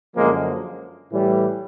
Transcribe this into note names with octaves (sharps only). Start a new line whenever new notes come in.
F#2 D3 F3 G#3 A#3
A2 E3 G3